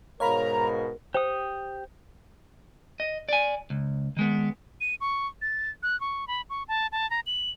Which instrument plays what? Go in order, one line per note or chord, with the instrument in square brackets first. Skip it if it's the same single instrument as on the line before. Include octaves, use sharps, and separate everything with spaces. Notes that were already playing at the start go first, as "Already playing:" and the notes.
[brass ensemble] G#2 B2 [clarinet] A#4 [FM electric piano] C#5 F5 B5 [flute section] A#5
[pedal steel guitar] G4 D#6 [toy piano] C5 G5
[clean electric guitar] D#5
D5 G#5
C#2
D#3 G#3 B3
[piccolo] D#7
C#6
A6
F#6
C#6
B5
C#6
A5
A5
A#5
F#7